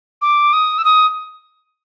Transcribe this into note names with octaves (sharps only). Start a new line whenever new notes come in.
D6
D#6
E6
D#6